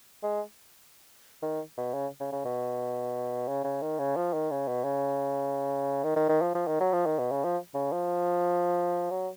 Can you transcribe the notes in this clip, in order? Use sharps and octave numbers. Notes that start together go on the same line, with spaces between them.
G#3
D#3
B2
C#3
C#3
C#3
B2
C#3
C#3
D#3
C#3
F3
D#3
C#3
B2
C#3
D#3
D#3
D#3
F3
F3
D#3
F#3
F3
D#3
B2
C#3
F3
C#3
F3
F#3